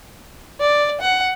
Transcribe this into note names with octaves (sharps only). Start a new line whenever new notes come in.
D5
F#5